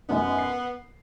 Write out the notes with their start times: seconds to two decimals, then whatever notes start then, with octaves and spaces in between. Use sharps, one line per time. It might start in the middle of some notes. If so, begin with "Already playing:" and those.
0.09 F#2 B3 D#4
0.38 C7